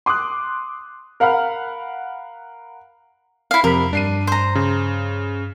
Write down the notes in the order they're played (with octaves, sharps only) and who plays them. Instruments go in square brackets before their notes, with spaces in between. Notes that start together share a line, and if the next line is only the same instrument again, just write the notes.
[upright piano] C6 D6 D#6 F#6
A#4 F5 F#5 B5 F6
[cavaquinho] E4 F5
[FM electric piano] F2 B5 [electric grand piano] C3 [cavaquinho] A#4
[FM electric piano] G2 [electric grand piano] D4 C7 D#7
[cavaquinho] C5 A#5
[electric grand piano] C#3